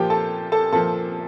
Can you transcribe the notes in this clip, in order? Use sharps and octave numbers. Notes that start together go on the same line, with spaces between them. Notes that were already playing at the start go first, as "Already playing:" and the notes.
Already playing: A#2 F3 G4 G5
A4 A5
A4 A5
A#2 F3 A4 A5